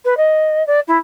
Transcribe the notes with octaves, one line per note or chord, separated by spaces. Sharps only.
B4
D#5
D5
E4